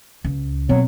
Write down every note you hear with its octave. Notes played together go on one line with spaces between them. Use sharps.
C#2
B2 F#3 C4